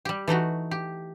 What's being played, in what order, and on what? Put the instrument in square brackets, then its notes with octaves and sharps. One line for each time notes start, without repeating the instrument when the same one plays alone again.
[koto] G3 G4
E3 A3 D#4 F#4
G4